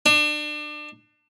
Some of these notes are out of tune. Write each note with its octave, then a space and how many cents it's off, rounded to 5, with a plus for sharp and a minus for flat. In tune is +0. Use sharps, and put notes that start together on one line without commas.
D4 +30